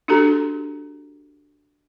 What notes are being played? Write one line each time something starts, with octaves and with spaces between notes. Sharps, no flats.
D4 F#4 G4 A4 A#5